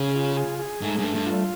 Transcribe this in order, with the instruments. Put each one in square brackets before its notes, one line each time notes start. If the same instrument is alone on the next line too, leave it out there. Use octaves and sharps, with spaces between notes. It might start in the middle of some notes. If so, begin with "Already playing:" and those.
Already playing: [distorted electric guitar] C#3 [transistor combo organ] G#4
[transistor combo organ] F4
G#4
G#4
[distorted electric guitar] G#2 [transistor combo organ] A3
[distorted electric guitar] G2 [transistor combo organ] A3
[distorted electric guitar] G2
[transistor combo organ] F4